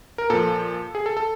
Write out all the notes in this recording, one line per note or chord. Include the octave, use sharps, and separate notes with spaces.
A#4
A#2 F3 A4
G#4
A4
A4